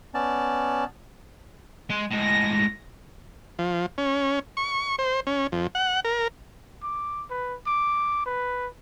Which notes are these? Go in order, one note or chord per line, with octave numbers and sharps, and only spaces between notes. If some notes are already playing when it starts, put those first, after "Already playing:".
B3 C#4 D5 A5
G#3 C6
A2 G#3 A#6
F3
C#4
C#6
C5
C#4
F2
F#5
A#4
D6
B4
D6
B4